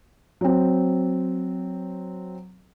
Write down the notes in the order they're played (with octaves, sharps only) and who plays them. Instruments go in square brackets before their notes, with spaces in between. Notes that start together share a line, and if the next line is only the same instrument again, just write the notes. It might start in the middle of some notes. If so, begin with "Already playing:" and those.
[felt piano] F#3 C4